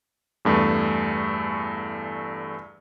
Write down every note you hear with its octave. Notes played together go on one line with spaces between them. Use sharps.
E2 G2 A3